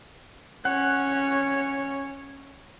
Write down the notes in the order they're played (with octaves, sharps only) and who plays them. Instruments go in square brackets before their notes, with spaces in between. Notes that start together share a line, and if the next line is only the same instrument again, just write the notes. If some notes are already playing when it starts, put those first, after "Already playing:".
[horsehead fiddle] C#4 C#5 [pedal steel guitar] F#5